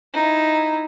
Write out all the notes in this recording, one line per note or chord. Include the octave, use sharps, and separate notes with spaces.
D#4 E4